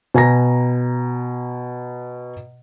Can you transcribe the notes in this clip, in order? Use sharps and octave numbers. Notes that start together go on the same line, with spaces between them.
B2 G#5 A#5 A#6